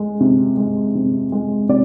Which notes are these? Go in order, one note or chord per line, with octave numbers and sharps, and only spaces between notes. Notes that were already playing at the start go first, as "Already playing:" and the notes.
Already playing: G#3
C3
G#3
C3
G#3
C3 D5